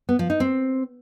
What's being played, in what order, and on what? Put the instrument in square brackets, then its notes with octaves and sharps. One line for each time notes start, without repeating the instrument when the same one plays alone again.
[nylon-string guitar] B3
F3
D#4
C4